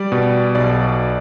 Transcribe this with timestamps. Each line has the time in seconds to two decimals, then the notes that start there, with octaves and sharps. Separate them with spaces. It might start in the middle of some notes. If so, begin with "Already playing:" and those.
Already playing: G3 D5
0.12 B2
0.55 B1 D5